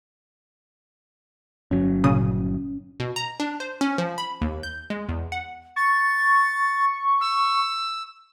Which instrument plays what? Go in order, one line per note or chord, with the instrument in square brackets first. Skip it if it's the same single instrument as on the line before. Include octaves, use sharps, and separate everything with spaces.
[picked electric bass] G1 F#3 [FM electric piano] C#4
[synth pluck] A#2 C#3 D#6
[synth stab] B2
A#5
D4
C5
C#4
F3
B5
D#2
G6
G#3
E2
F#5
[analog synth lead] C#6 [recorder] A6
[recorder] E6